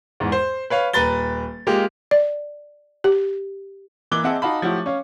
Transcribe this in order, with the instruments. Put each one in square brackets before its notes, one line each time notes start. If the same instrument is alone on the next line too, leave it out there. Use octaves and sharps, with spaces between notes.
[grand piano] E2 G#2
C5
B4 C#5 F5
D#1 B4 A#5 B5 A6 G7
G#3 A#3 F4 G4
[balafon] D5
G4
[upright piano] E3 A#3 D6 F#6 G7
C4 G#4 D#5 E5 F#5 A5
D#4 F#4 F5 A5 B5
F3 F#3 A3 E4 F#4 G4
C#4 C#5 F5